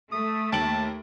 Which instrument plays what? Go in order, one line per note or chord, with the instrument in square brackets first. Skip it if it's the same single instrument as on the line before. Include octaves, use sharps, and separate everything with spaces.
[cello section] A3 [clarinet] D#6
[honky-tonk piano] D#2 D7 F#7 [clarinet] A5